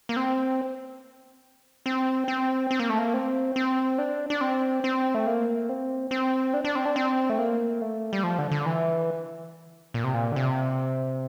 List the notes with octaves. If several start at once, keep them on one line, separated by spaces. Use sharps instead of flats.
A#3
C4
C4
C4
C4
A#3
A3
A#3
C4
C4
D4
D4
C4
C4
A3
A#3
C4
C4
D4
D4
C4
D4
C4
A3
A#3
A3
G3
F3
D3
D3
E3
A#2
C3
A#2
D3
C3